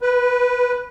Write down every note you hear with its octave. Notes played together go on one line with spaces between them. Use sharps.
B4